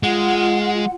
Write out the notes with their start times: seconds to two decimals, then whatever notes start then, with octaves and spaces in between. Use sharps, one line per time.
0.03 G#3 F4 F#5